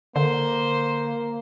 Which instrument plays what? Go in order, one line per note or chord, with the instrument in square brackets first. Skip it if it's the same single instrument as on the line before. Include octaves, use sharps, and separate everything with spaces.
[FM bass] D3 [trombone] A#3 [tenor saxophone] C5